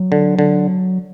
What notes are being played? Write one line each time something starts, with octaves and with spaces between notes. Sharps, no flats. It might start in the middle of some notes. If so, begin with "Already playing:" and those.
Already playing: F#3
D3
D3